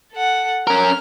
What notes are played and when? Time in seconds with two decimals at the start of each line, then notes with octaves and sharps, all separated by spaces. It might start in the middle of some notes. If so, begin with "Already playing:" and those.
0.12 A4 F#5
0.67 C#4 A#4 F6